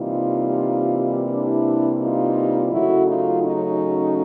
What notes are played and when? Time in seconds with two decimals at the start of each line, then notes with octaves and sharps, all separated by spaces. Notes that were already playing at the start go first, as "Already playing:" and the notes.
Already playing: C3 E3 G3 A#3 D#4 F4
1.32 D4 E4
2.02 D#4 F4
2.71 F#2 C#3 F#3 A3 E4 F#4
3.06 D#4 F4
3.41 C#4 D#4